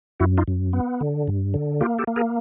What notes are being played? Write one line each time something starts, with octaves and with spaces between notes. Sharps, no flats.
F#2 E4 F#4
D#4 F4
F#2
B3
D3
G2
D3
A#3 F4 G4
G4 A4
A#3
G#4 A#4